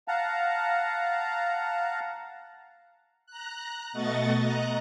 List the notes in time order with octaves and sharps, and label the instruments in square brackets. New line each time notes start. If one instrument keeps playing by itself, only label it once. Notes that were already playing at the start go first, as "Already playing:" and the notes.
[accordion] F5 F#5 A5 A#5
[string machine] A#5 F#6
B2 A3 D#5 F#5 C#6 A6
D#5 A#5 F#6